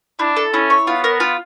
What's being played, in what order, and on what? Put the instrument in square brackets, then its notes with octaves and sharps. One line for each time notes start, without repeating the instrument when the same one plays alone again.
[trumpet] D4 [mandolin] E4
[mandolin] A4
[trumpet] C#4 [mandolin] E4
[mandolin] C#5
[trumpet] B3 [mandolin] F4
[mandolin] A#4
F4